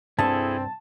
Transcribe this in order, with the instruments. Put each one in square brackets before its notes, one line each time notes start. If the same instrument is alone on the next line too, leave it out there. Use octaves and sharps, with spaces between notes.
[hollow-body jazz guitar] C2 G2 [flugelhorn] C4 [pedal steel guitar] E4 G#4 A4 [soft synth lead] A5